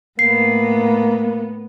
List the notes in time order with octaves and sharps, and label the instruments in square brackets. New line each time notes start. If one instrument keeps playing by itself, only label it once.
[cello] A2 B3 [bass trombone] A#3 [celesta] C7